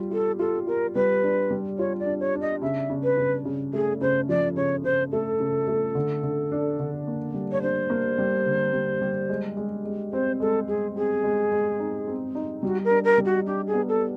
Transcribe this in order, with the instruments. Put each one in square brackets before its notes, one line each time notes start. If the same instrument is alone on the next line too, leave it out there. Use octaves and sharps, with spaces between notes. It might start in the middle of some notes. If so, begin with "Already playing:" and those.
Already playing: [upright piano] G3 F4
[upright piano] F4 [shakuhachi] A4
[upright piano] F4 [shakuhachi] A4
[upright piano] F4 [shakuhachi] A#4
[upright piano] G3 [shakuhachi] B4
[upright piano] D4
G3
[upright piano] F4 [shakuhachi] C#5
[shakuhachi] D5
[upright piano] D4
[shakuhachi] C#5
[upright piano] D4
[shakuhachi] D#5
[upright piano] C#3 [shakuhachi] E5
[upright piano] C#3
[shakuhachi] B4
[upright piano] C#3
C#3
[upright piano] A3 [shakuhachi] G#4
[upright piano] C#3 [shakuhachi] C5
[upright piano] F3 [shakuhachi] D5
[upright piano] C#3 [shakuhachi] C#5
[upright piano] C#3 [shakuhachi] C5
[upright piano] A3 [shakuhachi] A4
[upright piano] C#3
A3
D3
D3
D4
D3
A#3
G3
[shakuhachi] C#5
[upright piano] D4 [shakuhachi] C5
[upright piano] A#3
G3
D3
G3
G3
G#3
G#3
G#3
[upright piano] C4 [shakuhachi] C5
[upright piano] G#3 [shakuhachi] A4
[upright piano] G#3 [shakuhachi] G#4
[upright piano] C4 [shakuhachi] G#4
[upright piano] G#3
G#3
D#4
C4
D#4
[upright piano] G3 [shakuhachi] F#4
[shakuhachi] A#4
[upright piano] D4
[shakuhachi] A#4
[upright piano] G3
[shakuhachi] F#4
[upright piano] D4 [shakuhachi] G4
[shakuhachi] G#4
[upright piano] B3
[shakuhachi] A4